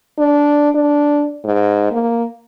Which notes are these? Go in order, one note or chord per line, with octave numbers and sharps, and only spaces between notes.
D4
D4
G#2
A#3